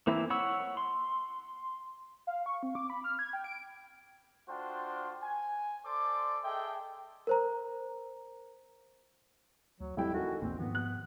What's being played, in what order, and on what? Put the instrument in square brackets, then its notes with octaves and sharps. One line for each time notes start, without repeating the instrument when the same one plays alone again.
[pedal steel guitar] E3 A#3 C4 E4
C#5 F#5 B5 C#6 E6
C6
[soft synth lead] F5
C#6
C4
D6
B5
F6
G#6
G5
D7
[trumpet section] A3 D4 F4 F#4 C5 G5
G#5
A4 C5 D5 C6 D6
G#4 A4 D#5 E5 G5
[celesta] A#4 C5 A#5
[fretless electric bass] D2 [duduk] F#3
[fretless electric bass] D#1 F#3 [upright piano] F2 G3 G5 [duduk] E4
[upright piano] D#3 E3 A3 [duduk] F#4
[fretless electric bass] E1 A#1 E2 [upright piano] A#2 [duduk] C4
[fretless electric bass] G#2 D#3 F3 [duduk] B3
[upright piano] F#6